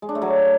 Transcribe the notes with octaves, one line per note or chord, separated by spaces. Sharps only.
G#3
D4
A3
F#3